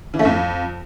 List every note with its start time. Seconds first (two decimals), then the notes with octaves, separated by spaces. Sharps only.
0.14 E3
0.19 A3
0.25 F2